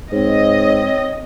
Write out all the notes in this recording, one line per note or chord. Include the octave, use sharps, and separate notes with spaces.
G#2 C4 C#5 D#5